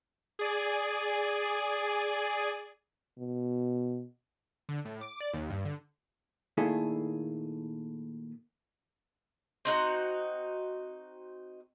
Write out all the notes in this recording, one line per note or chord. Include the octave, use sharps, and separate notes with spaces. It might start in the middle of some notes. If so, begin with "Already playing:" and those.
G#4 D5 G#5
B2
D3
A2
D6
D5
D#2
G2
D3
A#2 D#3 A3 E4 G#4 A4
C4 D#4 F#4 A#5